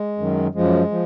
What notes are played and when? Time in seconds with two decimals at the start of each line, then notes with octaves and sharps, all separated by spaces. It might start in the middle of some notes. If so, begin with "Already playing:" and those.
Already playing: G#3
0.18 F#2 D#3 F#3
0.55 F#2 F3 G#3
0.91 F3